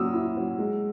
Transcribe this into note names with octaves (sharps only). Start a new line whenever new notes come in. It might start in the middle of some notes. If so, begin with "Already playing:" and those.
Already playing: F#3 A#3 D#6 E6
E4
F#3
G#3